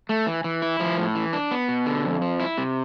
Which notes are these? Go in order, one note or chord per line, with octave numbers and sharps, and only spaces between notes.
A3
E3
E3
E4
F3
A2
E3
D4
B3
B2
D3
F2
F3
E4
C3